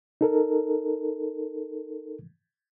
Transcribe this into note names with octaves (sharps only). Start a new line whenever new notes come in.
D#4 A4 A#4